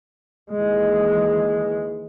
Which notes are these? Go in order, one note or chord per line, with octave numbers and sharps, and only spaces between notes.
D#2 E3 G#3